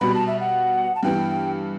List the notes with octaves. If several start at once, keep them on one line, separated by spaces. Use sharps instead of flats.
B2 G3 B3 F#4 B5
A5
E5
F#5
A5
G2 E3 B3 G5